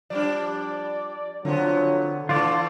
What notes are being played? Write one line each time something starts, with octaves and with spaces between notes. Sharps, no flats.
F3 G3 D4 D5
D3 F3 F#3 B3 C4
D3 E3 A3 F4 D5